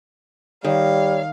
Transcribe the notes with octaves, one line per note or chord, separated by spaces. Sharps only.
D#3 G3 C#5 F5